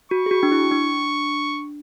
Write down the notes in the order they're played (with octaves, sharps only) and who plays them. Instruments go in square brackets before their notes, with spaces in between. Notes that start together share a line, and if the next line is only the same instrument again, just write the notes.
[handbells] F#4 [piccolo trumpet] C#6
[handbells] G#4
F#4
D4
E4
D4